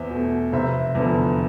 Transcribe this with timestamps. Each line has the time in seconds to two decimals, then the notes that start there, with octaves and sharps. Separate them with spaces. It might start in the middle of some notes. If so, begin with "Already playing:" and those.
Already playing: E2 C5 E5
0.10 B2 A3
0.53 F1 C5 E5
0.95 E2 D3 F3